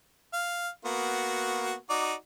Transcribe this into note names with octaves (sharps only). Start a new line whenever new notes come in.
F5
A#3 B3 F#4
D#4 F#4 D5